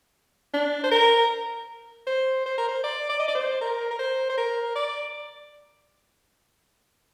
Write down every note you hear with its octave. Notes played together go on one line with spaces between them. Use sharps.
D4
C5
A#4
C5
C5
A#4
C5
D5
D5
D#5
D5
C5
A#4
A#4
C5
C5
A#4
D5